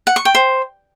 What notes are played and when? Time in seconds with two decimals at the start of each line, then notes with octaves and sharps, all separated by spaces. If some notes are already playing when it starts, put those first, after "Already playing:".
0.07 F#5
0.16 C#6
0.25 G5
0.35 C5